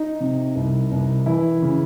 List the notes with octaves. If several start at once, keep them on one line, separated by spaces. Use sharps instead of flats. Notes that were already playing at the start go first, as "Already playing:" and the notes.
Already playing: D#4
C3
C2
C2
E3 E4
C#3